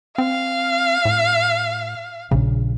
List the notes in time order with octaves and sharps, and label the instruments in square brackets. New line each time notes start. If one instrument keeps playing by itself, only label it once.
[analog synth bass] C4 [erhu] F5
[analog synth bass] A2
[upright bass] A#1 [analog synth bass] C#3